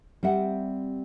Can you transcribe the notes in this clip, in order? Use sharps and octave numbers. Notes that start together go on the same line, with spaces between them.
G3 C4 E5 F#5